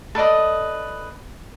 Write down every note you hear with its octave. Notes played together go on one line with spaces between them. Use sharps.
A4 B4 D5 D#5